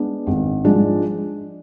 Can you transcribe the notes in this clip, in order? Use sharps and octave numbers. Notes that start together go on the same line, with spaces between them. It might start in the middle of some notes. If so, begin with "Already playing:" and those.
Already playing: G#3 B3 D4
G#1
G#2 F3 G#3 D4